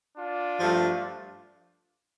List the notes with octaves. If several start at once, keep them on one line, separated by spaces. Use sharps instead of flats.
D4 F4
G2 F3 A3